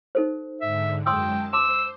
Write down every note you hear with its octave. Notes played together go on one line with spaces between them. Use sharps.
D#4 A4 C5
G#2 D3 E5
F#2 G#3 G5 A5 C6 D#6 E6
C5 A5 C6 D6 E6